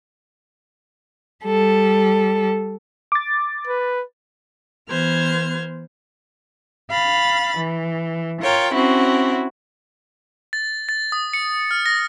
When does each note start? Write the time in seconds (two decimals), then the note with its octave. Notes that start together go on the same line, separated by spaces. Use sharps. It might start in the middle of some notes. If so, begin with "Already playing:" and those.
1.45 G3 A4
3.12 D6 A6
3.67 B4
4.88 E3 B3 C5 F6 G#6
6.90 F5 B5 A6
7.57 E3
8.40 F4 A#4 C#5 G5
8.73 C4 C#4 E4 F#4
10.53 A6
10.89 A6
11.12 D#6
11.33 C#7
11.71 F6
11.86 A#6